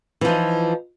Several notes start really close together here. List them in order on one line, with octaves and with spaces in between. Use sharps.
E3 F3 D#4